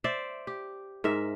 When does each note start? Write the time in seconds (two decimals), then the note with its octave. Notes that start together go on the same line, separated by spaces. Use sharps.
0.04 C5 D5 E5
0.47 G4
1.04 G#2 A#4 E5